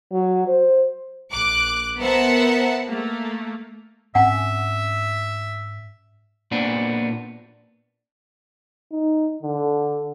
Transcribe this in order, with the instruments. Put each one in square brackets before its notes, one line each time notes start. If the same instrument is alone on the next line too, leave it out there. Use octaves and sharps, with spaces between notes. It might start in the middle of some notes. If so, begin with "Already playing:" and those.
[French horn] F#3
C5
[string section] A#1 D6 F#6
B3 A#4 C5 E5 F#5 A5
A3 A#3
[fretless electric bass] G#2 C4 C#4 [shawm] E5 [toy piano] F#5 G#5
[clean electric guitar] A#2 B3 C4 D4
[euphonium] D#4
D3